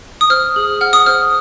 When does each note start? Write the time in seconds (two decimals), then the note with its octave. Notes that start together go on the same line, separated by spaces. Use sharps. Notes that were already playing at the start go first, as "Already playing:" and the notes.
0.21 D#6
0.30 C5 F6
0.56 G#4
0.81 F#5 F6
0.93 D#6
1.06 C5 F6